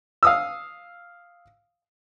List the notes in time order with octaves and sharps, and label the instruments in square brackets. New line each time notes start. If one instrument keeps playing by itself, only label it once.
[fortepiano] F5 D#6 E6